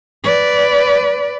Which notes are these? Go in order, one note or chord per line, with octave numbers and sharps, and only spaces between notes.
B4 D5